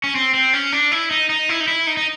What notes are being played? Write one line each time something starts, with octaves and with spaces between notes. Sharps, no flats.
C#4
C4
C4
C#4
D4
E4
D#4
D#4
E4
D#4
E4
D#4
D#4